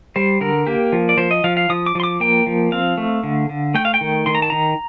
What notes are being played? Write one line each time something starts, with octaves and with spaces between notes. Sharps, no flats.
G3 C5
D3 A#4
A#3 G4
F3
D5
F3 C5
D#5
F3 F5
F5
F3 D#6
D6
F3 C6
D6
A#3 G5
F3
C4 F5
A3
D3
D3
A3 G5
F5
G5
D#3
D#3 C6
A#5
A5
D#3 A#5